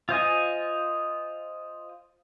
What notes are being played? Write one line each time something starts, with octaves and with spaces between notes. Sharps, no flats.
F4 C5 D#5 G#5